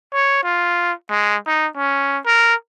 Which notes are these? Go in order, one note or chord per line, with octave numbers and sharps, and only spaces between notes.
C#5
F4
G#3
D#4
C#4
A#4